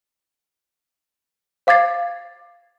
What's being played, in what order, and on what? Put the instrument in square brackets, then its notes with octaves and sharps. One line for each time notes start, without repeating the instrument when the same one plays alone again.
[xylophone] C5 F5 D6 G#6 A6 C7